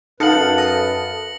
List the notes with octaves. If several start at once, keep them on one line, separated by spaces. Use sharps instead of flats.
F#2 D#4 A4 B4 F5 F#5 C#7 F#7
D#6 A#6